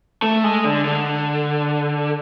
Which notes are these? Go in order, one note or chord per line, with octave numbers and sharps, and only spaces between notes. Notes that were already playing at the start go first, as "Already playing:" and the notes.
A3
G#3
D3
D3